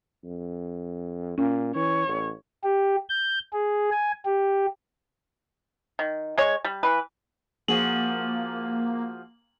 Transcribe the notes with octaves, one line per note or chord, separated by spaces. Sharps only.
F2
A#2 C#4
E3 C#5
A1
G4
G6
G#4
G#5
G4
D#3
G#3 C#5
G3
E3 B4
F3 A#3 F#4 G#4 F#7